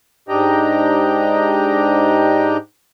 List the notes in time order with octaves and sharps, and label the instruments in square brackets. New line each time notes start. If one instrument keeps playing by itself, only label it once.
[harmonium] G#2 D4 G4 D#5 G5 A#5